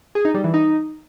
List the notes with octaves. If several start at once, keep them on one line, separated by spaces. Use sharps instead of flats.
G#4
D#4
G3
E3
D#4